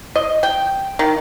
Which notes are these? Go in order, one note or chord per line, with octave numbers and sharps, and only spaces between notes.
D#5
G5
D#3